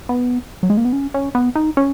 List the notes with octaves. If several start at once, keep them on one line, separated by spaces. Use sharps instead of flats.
B3
F#3
G#3
A#3
B3
C#4
C#4
B3
D#4
C#4